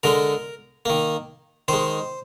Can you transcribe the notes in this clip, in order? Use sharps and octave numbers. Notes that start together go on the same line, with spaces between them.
D3 G#3 A#4
D#3 A#3
D#3 G#3 C5